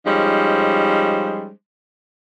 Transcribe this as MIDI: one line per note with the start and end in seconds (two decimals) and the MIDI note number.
0.06 1.51 53
0.06 1.51 55
0.06 1.51 56
0.06 1.51 61
0.06 1.51 63
0.06 1.51 72